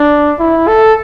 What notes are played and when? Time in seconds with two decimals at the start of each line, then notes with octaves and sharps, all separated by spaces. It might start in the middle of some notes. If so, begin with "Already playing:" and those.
Already playing: D4
0.39 E4
0.68 A4